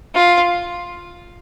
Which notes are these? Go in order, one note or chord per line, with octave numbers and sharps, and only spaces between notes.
F4